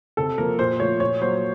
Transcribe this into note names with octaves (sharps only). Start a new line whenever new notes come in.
C3 A4
F3 A#3 A#4
A#2 C5
F3 A3 C#5
A#2 C#5
F#3 A#3 C5